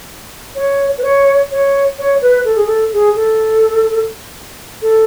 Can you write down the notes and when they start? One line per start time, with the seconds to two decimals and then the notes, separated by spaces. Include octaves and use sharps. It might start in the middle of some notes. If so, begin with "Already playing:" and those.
0.55 C#5
0.98 B4
1.03 C#5
1.51 C#5
1.99 C#5
2.21 B4
2.45 A4
2.56 G#4
2.66 A4
2.93 G#4
3.16 A4
4.82 A4